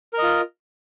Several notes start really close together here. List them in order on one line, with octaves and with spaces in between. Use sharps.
A#4 D#5 F4